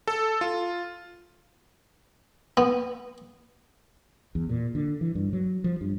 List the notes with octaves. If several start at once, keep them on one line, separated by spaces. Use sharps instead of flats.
A4
F4
B3
E2
A#2
D3
E3
G2
F#3
F3
G2